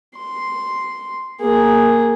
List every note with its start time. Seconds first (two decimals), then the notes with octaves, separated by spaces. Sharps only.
0.17 C6
1.40 A#3 G#4